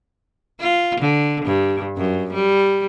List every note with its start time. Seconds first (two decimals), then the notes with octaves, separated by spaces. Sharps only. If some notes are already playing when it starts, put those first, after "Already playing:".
0.60 F4
1.00 D3
1.45 G2
1.97 F#2
2.33 G3